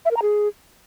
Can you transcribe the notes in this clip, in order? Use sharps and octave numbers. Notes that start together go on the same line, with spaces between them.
E5
A#4
A#5
G#4